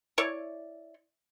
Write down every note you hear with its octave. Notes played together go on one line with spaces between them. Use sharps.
E4 C#5 D5